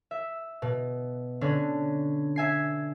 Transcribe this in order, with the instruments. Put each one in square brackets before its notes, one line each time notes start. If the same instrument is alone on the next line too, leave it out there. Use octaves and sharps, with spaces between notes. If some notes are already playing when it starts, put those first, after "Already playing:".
[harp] E5
B2
D3 C#4 D4
E5 G#5 C7